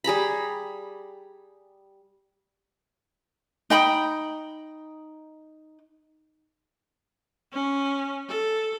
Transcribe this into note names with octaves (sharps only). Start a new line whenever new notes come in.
G3 G#4 A#5 B5
D#4 G5 B5 D#6
C#4
A4